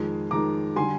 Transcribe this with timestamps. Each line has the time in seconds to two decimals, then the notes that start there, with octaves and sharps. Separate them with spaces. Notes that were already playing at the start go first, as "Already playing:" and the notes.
Already playing: F2 D#3 G#3
0.31 F2 D#3 G#3 A#5 D6
0.76 D3 G3 G#5 C6